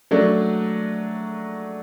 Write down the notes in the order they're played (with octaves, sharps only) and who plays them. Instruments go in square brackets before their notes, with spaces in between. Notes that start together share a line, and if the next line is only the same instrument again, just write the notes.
[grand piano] F#3 A3 D4